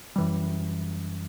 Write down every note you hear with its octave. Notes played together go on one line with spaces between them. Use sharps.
F#2 E3 G3